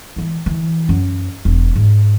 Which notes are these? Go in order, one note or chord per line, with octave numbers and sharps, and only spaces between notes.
E3 G#3
E3
F#2
E1
G#2